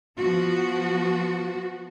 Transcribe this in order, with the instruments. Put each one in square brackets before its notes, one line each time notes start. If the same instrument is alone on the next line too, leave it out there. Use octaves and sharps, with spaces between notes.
[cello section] F3 B3 F#4